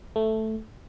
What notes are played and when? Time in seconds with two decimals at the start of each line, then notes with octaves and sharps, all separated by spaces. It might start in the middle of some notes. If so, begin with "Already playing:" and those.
0.16 A3